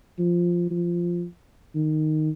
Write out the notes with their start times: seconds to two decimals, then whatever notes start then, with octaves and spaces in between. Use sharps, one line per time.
0.19 F3
0.70 F3
1.75 D#3